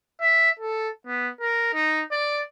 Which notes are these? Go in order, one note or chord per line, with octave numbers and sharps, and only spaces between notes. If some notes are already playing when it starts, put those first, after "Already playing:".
E5
A4
B3
A#4
D#4
D5